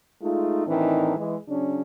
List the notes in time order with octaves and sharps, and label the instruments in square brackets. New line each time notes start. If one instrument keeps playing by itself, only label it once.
[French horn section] G#3 A3 D#4 F4
A2 D#3 E3 C4 D4 D#4
E3 G#3
C#3 F#3 C#4 D4